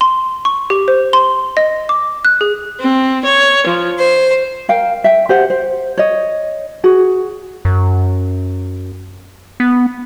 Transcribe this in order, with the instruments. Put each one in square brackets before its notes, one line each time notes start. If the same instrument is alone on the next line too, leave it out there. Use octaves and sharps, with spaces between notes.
[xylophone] C6
C#6
G4
C5
C6
D#5
D6
F#6
G#4
[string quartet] C4
C#5
F3
C5
[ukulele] A#4 F5 G5
E5 G5
G4 C5 F#5
C5
C#5 D#5
F#4 G#4
[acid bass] F#2
B3